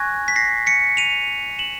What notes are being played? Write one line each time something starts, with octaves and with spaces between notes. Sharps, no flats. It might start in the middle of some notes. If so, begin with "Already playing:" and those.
Already playing: G#5 C#6 F#6 G#6 A#6
B6
A#6 C7
B6 C#7
D#7 F7
E7 F#7